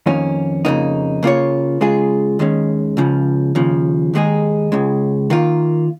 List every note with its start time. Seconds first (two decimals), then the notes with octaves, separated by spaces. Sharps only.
0.06 F2 D#3 A#3 C#4
0.65 F2 C#3 A#3 D#4
1.23 C#3 A#3 F4 C#5
1.81 C#3 G#3 F4 G#4
2.39 D#2 D#3 G#3 C#4
2.97 C#2 C#3 F3
3.55 D#2 C#3 F3
4.14 D#2 D#3 G#3 D#4 G#4
4.72 C#2 C#3 G#3
5.30 D#3 A#3 F4